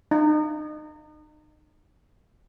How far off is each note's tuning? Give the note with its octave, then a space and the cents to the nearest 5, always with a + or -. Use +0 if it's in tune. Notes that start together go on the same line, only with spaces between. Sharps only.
D#4 -35